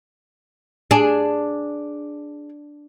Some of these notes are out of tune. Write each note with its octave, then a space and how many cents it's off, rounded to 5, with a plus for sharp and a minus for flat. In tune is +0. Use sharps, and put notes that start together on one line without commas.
D4 +0 G#4 +0